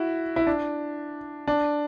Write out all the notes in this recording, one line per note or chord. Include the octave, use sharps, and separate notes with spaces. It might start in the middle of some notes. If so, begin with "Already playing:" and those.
Already playing: E4 F#4
E4
D4
D4